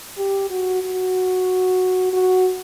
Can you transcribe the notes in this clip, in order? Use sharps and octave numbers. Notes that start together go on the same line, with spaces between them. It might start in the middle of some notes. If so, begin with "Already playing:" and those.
G4
F#4
F#4
F#4